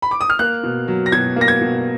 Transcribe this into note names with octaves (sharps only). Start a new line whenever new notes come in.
B5
D6
D#6
F6
A#3 F#6
B2
F#3
A#6
B2 G#6
A#3
A#6
G#6
B2